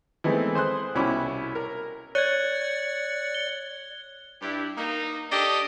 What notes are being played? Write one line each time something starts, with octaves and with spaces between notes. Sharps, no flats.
E3 G#3 A3 B3 C4 D#4
G#4 C5 C6 D#6 F#6
C2 B2 C#4 E4 B5 D6
A#4
C#5 D5 F#6 G#6 C#7
G7
G2 D4 E4 G4
A#3 D#4
D4 G4 A4 D#5